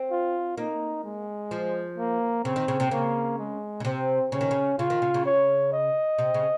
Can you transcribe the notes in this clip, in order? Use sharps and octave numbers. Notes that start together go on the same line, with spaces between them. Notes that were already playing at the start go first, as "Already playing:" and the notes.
Already playing: C4
F4
A#3 D#4
G#3
F3
A#3
C#3 C4
D#3
C#3
C3
C#3 A#3
G#3
C#3
C3 C4
C#3 C#4
D#3
C#3
C#3 F4
D#3
C#3
C#3
C#5
D#5
C3
C#3